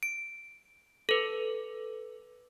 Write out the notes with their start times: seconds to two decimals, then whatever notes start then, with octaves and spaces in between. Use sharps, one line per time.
0.03 D7
1.09 A4 B4